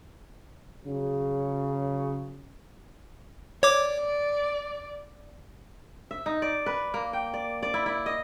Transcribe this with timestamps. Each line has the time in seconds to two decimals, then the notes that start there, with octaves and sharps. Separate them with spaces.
0.85 C#3 F#3
3.63 C#5 D5 D6
6.11 E5
6.26 D#4
6.42 D5
6.66 B4
6.94 A#3
7.13 G5
7.34 D5
7.63 D5
7.74 E4
7.86 E4
8.06 D#5